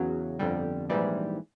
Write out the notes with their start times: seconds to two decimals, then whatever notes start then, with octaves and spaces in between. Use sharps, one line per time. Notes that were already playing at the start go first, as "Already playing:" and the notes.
Already playing: E2 C#3 F#3
0.39 G1 F2 D3 G3
0.90 A#1 G#2 E3 G3